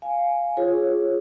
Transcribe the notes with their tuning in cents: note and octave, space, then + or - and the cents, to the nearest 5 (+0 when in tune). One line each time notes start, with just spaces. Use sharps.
F5 +0 G#5 +0
F4 +0 G#4 +0 C#5 -35